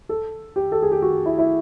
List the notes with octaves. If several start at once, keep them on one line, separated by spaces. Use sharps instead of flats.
A4
G4
A4
G#4
G4
F#4
E4
E4